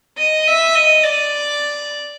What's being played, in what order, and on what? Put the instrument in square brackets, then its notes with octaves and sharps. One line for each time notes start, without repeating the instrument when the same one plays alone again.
[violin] D#5
E5
D#5
D5